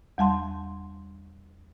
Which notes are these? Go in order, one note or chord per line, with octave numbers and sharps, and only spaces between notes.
E2 G3 A5 C6